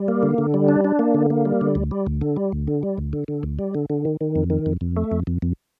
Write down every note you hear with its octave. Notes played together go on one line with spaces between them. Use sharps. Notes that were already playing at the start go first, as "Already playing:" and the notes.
Already playing: G3
A#3
D3
D3
G3
D4
D4
A#3
D3
A#3
G3
D3
D2
G3
D2
D3
G3
D2
D3
G3
D2
D3
D3
D2
G3
D3
D3
D#3
D#3
F2
D#3
F2
F2
A3
F2
F2
F2